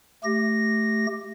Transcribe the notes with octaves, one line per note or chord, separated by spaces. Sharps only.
A3 G4 A#6